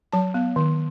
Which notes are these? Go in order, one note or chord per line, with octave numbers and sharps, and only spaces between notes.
F#3 A5
B3
D#3